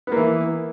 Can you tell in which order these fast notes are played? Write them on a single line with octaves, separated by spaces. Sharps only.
B3 A#3 E3